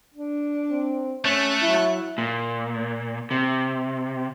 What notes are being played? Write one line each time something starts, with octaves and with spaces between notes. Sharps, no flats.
D4
C4
A3 C#4 C#6 F#6
F#3 E4
A#2
C3